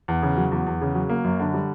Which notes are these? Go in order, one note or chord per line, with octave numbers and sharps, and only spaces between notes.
E2
C#3
F#3
E2
E2
C#3
F#3
A#3
F#2
D3
G3